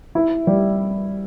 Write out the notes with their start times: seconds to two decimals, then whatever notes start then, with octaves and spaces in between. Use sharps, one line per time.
0.15 E4
0.47 G3